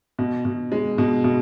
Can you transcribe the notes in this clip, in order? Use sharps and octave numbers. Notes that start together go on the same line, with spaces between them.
B2
B2
G#3
B2
B2